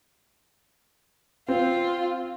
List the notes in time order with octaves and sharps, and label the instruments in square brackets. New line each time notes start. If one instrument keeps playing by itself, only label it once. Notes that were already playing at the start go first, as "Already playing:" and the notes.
[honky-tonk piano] C4 [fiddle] F4